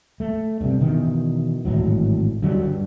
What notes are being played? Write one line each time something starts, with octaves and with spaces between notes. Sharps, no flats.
A3
G2 C3
B2 D#3 E3
G#1 A2 E3 F#3
D3 F#3 G3
G2